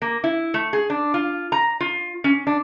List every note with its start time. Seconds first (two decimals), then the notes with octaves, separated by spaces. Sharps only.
0.02 A#3
0.24 E4
0.54 A3
0.73 G#4
0.90 D4
1.14 F4
1.52 A#5
1.80 F4
2.24 C#4
2.47 D4